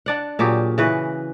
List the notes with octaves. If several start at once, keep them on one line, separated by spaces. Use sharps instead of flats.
D4 D5 F#5
A#2 F#3 G4 G#4
C#3 E3 F#4 B4